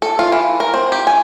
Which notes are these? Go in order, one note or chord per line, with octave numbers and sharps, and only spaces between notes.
A4
F4
E3
A#4
C4
G4
G#5